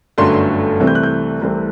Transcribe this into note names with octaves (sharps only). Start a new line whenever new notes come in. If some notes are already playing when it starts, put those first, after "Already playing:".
G1 F#2 D3 F#3 A3 C6
C2 C3 E3 A3 C4
G6
F#6
G6
C2 C3 E3 A3 C4